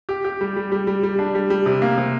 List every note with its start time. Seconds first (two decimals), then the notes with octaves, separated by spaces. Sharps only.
0.09 G4
0.25 G4
0.41 G3
0.56 G3
0.72 G3
0.87 G3
1.03 G3
1.19 D4
1.35 G3
1.50 G3
1.66 C3
1.82 A#3
1.98 C3